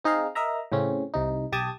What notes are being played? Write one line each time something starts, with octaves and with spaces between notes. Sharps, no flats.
C4 D#4 G#4 D#5 F5
A#4 D#5 E5 A#5
A2 C#3 C4 C#4
C2 C3 D#4
B1 G4 G5 A5 D#6 G#6